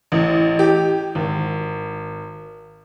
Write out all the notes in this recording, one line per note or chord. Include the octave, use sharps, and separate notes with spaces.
A1
G4
G#1